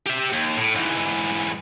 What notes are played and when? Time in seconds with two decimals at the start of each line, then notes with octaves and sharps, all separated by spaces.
0.07 G4 E5
0.33 D#2
0.57 A2
0.76 G#2 E3